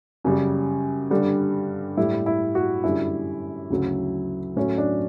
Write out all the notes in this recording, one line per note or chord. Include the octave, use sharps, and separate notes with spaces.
F#2 C#3 G3
G2 D3 G3
A2 G3 E4
E4
F#4
F#2 D3 G3 E4
D2 C#3 F#3
A2 F#3 C#4
D4